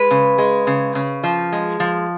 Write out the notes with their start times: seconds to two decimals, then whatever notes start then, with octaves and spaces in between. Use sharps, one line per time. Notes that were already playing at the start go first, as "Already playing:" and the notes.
Already playing: G#3 B4
0.11 C#3
0.38 G#3
0.67 C#3
0.95 C#3
1.23 F3
1.52 G#3
1.80 F3